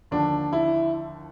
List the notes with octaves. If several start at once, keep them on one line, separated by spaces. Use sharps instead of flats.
D#2 D3 F3 D4
E4